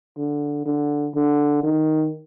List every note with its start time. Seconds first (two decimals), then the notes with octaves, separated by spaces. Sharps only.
0.17 D3
0.66 D3
1.15 D3
1.63 D#3